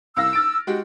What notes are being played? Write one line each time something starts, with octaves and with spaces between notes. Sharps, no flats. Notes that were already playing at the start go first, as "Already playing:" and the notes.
C2 F5 E6 A#6
F6 A6 D7
G#3 F#4 G4